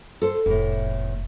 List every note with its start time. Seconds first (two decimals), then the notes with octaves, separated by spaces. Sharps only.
0.22 A4 C5
0.46 F1 E2 A2